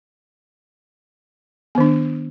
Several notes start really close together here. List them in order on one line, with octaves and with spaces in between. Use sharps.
B3 D#3 D4